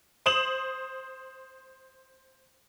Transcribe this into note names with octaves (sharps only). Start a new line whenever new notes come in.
C5 D#6 E7 F#7